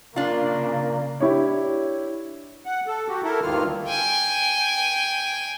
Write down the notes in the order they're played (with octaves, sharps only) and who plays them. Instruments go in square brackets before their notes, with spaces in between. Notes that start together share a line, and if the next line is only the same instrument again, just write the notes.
[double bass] C#3 A#3 [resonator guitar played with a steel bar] D4 F4
[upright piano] D4 E4 G4 C#5
[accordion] F#5
A4
F#4 G4
E4 A4 A#4
D2 G2 D#3 A#3 F4 F6
[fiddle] G5 G#5